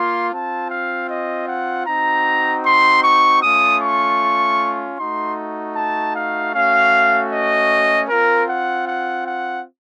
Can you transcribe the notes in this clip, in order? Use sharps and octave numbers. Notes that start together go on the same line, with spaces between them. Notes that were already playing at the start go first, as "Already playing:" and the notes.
Already playing: A#3 F4 C6
C4 F4 A5
F5
D#5
F#5
C4 D#4 F#4 A#5
C6
C#6
A3 C#4 F4 D#6
C#6
A3 D#4 F#4 C6
A5
F5
A3 C#4 F#4 F5
D#5
C4 F4 A#4
F#5
F#5
F#5